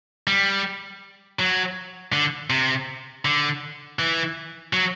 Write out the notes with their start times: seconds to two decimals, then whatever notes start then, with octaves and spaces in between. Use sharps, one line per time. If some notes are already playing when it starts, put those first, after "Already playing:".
0.27 G3
1.39 F#3
2.13 D3
2.50 C3
3.25 D3
3.99 E3
4.73 F#3